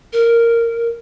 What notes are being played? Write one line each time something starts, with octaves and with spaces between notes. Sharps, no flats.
A#4